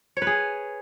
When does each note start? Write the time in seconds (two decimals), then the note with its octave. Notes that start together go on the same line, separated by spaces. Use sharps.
0.17 C#5
0.22 B4
0.27 G#4